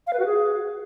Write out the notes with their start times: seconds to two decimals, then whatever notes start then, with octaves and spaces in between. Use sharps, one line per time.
0.07 F5
0.13 B4
0.19 F#4
0.26 G#4